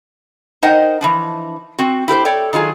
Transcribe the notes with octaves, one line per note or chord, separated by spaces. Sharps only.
D#4 A#4 C5 D#5 F#5 G5
E3 F3 D4
C4 F#4
E4 G4 A#4 C5
A4 C#5 D5 G5
D#3 F#3 F4 G#4